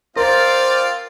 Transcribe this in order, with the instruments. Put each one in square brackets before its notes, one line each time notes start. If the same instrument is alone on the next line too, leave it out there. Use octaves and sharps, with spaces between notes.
[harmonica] C4 F4 F5 [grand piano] A#4 [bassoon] C5 [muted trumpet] D5